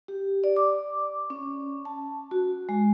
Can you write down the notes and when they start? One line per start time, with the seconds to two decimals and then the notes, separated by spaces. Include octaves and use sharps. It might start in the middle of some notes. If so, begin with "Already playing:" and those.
0.08 G4
0.44 D5
0.56 D6
1.30 C#4
1.85 A5
2.31 F#4
2.69 G#3